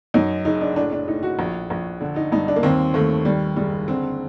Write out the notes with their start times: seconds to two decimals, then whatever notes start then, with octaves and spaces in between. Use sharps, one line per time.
0.14 F#2 D#4
0.45 F#1 D#4
0.61 D4
0.76 A2 D4
0.93 D4
1.08 A2 D#4
1.23 F#4
1.39 A#1
1.70 A#1
2.01 D3
2.16 D#4
2.32 G2 D#4
2.48 D4
2.56 A#3
2.63 D#2 C4
2.94 D#2 A3
3.25 D#3 G3
3.56 F#1 G3
3.88 D3 C4